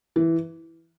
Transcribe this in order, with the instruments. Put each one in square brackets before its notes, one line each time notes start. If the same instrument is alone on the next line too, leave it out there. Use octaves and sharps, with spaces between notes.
[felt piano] E3